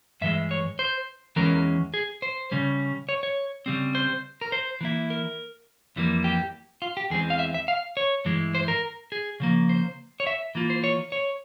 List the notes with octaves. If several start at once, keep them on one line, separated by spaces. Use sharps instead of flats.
G2 E3 G#3 E5
C#5
C5
E2 E3 G#3 C#4 A#4
G#4
C5
C#3 G3 C#4
C#5
C#5
C#3 G3 C4
C5
A#4
C5
E3 A#3 E4
A#4
F2 E3 G3 A#3
G4
F4
G4
E2 E3 G#3 C4 G#4
F5
E5
E5
F5
C#5
G2 E3 G#3 E4
C5
A#4
G#4
C#3 F3 A#3
C5
C#5
E5
E3 A#3 F4
C5
C#5
C#5